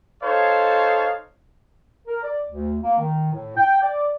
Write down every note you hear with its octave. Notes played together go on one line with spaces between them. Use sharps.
D#4 A4 C5 C#5 F5
A#4
D5
D2
A#3
D#3
A2
G5
D5